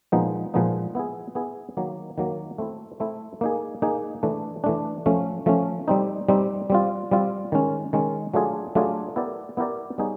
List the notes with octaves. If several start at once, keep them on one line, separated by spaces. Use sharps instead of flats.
A#2 F3 G#3 B3 D#4
A#2 F3 G#3 B3 D#4
B3 E4 G#4
B3 E4 G#4
D#3 F#3 A#3
D#3 F#3 A#3
A3 C4 E4
A3 C4 E4
A#3 D#4 G#4
A#3 D#4 G#4
E3 A3 D4
E3 A3 D4
F3 A3 C#4
F3 A3 C#4
G3 C4 D#4
G3 C4 D#4
G3 C4 F4
G3 C4 F4
D#3 G#3 C#4
D#3 G#3 C#4
F#3 A3 D4 F4 G#4
F#3 A3 D4 F4 G#4
B3 E4 G4 A#4 D5
B3 E4 G4 A#4 D5
G3 B3 D#4 G#4 C#5